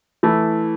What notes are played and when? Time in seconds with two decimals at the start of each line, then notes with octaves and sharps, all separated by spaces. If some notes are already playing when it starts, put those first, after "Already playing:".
0.23 E3 A3 E4